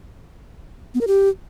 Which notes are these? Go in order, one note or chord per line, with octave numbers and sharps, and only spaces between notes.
B3
A#4
G4